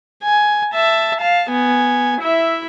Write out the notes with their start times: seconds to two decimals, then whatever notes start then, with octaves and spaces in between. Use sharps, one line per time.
0.23 G#5
0.74 E5 A5
1.20 F5 A5
1.51 B3 G#5
2.21 E4 E5